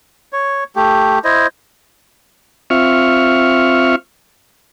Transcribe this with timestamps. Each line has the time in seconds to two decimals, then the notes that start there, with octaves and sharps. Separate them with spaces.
0.33 C#5
0.76 A3 G4
1.24 E4 C5 D#5
2.70 C4 F4 E5 C#6 F6